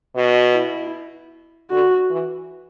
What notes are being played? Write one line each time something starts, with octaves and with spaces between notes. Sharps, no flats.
B2 F#4
E4
D3 F#4
E3